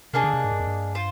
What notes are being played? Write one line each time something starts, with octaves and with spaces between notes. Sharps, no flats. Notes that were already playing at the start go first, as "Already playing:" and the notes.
C3 A#3 D4 G#4 D#5
D3
C3
G#2
G2
F2
G2
F4 C5